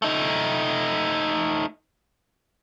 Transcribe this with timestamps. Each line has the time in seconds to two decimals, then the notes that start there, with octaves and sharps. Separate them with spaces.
0.02 A3 D#4